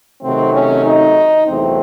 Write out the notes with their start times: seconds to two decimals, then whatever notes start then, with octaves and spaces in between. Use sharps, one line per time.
0.22 C3 D#3 F#3 A3 C4
0.54 C#4
0.85 D#4
1.47 E2 C3 F#3 A3 C4